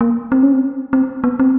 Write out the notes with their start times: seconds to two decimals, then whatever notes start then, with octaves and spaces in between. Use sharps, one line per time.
0.01 A#3
0.32 C4
0.43 C#4
0.53 C4
0.93 C4
1.24 B3
1.40 C4